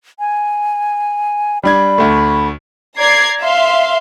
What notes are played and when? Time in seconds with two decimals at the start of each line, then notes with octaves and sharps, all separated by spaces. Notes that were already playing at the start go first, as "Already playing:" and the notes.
0.19 G#5
1.64 G3 D4 B5 G#6
1.98 D2 A3
2.99 D5 A#5 G#6 C7
3.42 E5 F5 C6